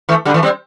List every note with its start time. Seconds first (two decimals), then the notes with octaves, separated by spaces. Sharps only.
0.09 E3 A3
0.25 D3 G3
0.34 E3 A3
0.43 G3 C4